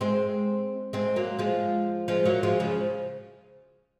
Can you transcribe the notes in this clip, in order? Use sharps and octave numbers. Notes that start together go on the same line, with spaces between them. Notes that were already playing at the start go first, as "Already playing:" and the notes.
G#3 C4
G#3 C4
F#3 A#3
F3 G#3
F3 G#3
F#3 A#3
F3 G#3
C#3 F3